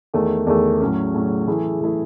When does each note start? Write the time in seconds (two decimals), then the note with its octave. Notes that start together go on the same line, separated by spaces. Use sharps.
0.14 E2 D#3 A3
0.47 E2 D#3 A3
0.81 A2 F#3 C#4
1.14 A2 F#3 C#4
1.47 E3 A3 E4 G#4
1.81 E3 A3 E4 G#4